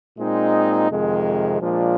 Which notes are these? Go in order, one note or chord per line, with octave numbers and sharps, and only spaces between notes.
A#2 G#3 C4 D#4
F2 C3 D#3 G#3
A#2 F3 G#3 D4 F4